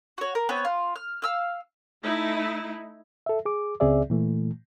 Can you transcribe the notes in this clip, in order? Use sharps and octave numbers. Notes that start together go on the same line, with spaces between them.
F#4 C#5
A#4
B3 C4 C#5
F4
F6
F5 E6 F6
A3 D#4 E4
A4 E5
G#4 D6
C#2 C#3 C4 G#4 D5 E5
A#2 E3 A3